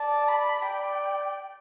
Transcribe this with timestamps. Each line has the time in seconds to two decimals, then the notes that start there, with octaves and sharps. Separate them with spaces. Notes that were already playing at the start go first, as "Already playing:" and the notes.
Already playing: D5 A5
0.29 B5
0.65 D5 G5